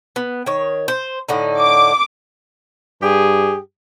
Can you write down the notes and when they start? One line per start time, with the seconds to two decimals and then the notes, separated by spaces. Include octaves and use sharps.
0.16 B3
0.46 D#3 C#5
0.88 C5
1.29 A2 D3 D#4
1.60 D6
3.03 G2 G4 G#4